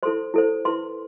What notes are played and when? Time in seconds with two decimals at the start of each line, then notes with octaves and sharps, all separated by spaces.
0.03 E4 A4 C5 C6
0.34 E4 A4 C5
0.65 E4 B4 C6